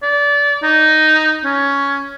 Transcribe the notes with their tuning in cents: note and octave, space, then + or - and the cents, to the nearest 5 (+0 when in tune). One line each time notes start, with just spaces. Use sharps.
D5 -25
D#4 +0
C#4 +10